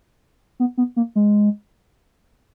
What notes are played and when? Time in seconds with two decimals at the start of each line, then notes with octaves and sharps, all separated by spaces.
0.60 B3
0.78 B3
0.96 A#3
1.16 G#3